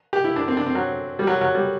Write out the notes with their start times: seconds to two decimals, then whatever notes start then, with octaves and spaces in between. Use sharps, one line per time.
0.13 G4
0.24 E4
0.36 D4
0.48 C4
0.57 D4
0.66 C4
0.75 F#3
1.19 G3
1.27 F#3
1.41 F#3
1.55 G3